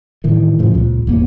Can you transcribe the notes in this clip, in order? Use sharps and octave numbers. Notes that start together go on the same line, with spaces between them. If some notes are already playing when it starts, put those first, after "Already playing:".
A2 D#3 E3
F#2 A2 C#3 F3
C#2 A#2
E1 A1 A#3 B3